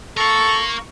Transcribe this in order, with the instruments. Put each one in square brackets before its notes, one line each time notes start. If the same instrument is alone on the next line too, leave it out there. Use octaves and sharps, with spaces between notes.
[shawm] A4 [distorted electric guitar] A#4 F5 [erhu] C#6